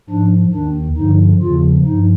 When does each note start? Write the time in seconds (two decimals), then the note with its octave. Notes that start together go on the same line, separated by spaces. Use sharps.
0.09 G#2 F3 D4
0.53 D#2 D#3 D4
0.97 G2 D3 F3 D#4
1.42 E2 C#3 F3 F4
1.86 G2 F3 D#4